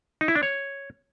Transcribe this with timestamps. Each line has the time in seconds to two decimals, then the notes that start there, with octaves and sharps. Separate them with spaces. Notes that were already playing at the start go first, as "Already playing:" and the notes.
0.21 D#4
0.28 E4
0.35 D4
0.43 C#5